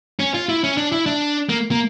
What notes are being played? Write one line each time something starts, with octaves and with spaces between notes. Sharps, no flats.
C#4
F4
E4
C#4
D4
E4
D4
A#3
A#3